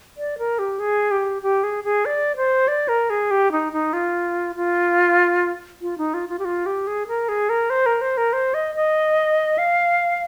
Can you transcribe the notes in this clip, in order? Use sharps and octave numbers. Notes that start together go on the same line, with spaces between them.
D5
A#4
G4
G#4
G4
G4
G#4
G#4
D5
C5
D5
A#4
G#4
G4
D#4
D#4
F4
F4
F4
D#4
F4
F4
G4
F4
G4
G#4
A#4
G#4
A#4
C5
A#4
C5
A#4
C5
D#5
D#5
F5